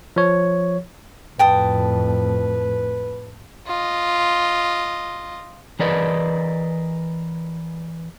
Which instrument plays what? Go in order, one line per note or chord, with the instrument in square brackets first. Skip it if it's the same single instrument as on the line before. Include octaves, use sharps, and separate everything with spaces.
[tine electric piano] F3 C#5
[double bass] F2 A2 [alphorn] B4 [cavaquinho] G5 A5 D#6
[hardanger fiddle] F4 D#5
[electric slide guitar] E3 G#4 A#4 B4 D5 D#5